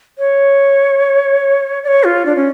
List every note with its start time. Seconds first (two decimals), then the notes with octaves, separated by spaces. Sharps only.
0.18 C#5
1.83 D5
1.88 C#5
2.04 F4
2.26 D4
2.36 C#4